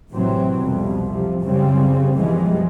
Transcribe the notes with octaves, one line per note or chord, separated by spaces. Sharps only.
A1 A2 C3 E3 F#3 C4
C2 F2 B2
C3 F3
C2 F#2 C#3 G3 C4
B1 F#2 E3 F3 G3 G#3